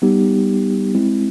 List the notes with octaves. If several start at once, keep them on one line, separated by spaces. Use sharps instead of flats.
G3 B3 D#4 G4
G#3 C4 E4